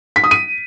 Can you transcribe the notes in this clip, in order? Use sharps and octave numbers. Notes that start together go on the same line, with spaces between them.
B6
D#6
D#7